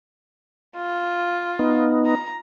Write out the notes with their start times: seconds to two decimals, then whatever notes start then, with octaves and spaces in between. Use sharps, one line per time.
0.76 F4
1.59 B3 D#4
2.06 A#5